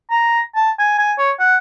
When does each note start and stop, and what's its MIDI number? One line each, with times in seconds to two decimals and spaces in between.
0.11 0.40 82
0.55 0.71 81
0.79 0.96 80
0.99 1.12 80
1.18 1.31 73
1.40 1.57 78